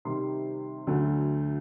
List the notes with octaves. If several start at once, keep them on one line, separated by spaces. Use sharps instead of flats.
C3 D#3 G3 C6
D2 D3 F#3 A3